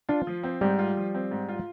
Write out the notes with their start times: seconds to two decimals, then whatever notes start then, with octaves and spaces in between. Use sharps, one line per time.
0.09 D4 F4
0.27 F3
0.43 C4
0.61 G#2 G3
0.79 F4
0.97 F3
1.15 C4
1.31 G#2
1.49 F4